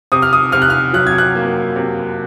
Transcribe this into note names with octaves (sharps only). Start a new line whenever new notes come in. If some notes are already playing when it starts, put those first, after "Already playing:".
C3 D#6
F6
D#6
C3 F6
F#6
F6
F#3 F#6
G#6
F#6
A#3
C3